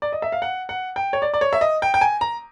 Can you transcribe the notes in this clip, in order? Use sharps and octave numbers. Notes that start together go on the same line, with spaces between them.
D5
D#5
E5
F5
F#5
F#5
G5
C#5
D5
D5
C#5
E5
D#5
G5
G5
G#5
A#5